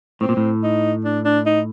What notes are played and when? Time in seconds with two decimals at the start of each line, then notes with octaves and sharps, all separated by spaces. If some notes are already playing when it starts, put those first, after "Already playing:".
0.21 A2 C4
0.29 A#2
0.37 A2
0.63 D#4
1.05 D4
1.25 D4
1.46 D#4